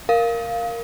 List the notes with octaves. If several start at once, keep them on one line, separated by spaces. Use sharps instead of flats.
A#4 F5